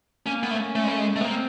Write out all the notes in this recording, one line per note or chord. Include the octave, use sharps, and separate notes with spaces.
A#3 C#4
B3
A3
C4
C#4
A3
G#3
A#3
A3
G#3
A3
B3
A#3 C4